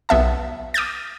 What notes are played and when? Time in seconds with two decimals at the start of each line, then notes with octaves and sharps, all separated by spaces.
0.09 B1 B3 E5 A5
0.74 D6 D#6 F6 G6 A6